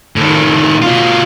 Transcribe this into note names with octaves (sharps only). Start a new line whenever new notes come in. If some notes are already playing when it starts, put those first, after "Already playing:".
A2 D#3
B2 F4